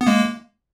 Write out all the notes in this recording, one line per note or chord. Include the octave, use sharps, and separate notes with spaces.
B3
G#3 A#3